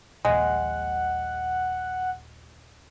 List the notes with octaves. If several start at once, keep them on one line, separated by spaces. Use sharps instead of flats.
D#1 A#1 G#3 F#5